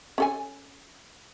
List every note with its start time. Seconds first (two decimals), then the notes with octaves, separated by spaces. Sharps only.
0.18 C#4 A4 G#5